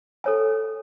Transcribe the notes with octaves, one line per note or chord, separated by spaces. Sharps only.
A4 C#5 G#5